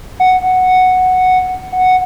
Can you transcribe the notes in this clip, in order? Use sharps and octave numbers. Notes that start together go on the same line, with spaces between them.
F#5
F#5